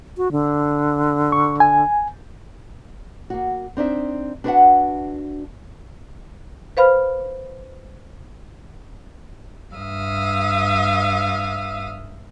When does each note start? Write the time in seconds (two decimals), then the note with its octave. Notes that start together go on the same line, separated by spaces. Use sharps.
0.17 F#4
0.32 D3
1.32 C#6
1.60 G#5
3.30 A#3 F#4
3.77 C4 D4 D#4 E5
4.44 D4 F#4 B4 D5 E5 F#5
6.77 B4 C5 F5 B5 F6
9.75 G2 E5 F5 D#6